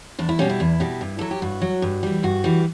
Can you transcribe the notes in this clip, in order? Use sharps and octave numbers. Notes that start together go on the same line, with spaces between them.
E2 D4
E4
B2 G3 C#4
E4
E2
B2 G3
G2
F#3 A4
G4
G2 F#4
F#3
G2
E3 G3
G2 F#4
E3 G3